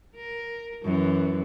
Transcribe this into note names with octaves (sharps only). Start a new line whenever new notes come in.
A#4
F#2 E3